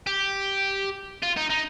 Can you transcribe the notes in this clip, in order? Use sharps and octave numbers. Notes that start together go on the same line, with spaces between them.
G4
F4
D#4
D#4